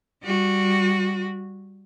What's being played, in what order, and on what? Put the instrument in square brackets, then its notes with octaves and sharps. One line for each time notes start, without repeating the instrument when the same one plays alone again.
[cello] G3 F#4